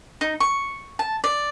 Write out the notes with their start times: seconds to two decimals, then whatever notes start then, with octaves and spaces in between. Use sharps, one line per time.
0.21 D#4
0.40 C#6
0.99 A5
1.24 D5